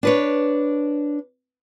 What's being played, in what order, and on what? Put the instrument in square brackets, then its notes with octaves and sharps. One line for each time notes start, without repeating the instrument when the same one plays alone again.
[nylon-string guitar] D4 B4 C#5